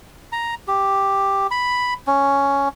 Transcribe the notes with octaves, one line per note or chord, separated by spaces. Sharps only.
A#5
G4
B5
C#4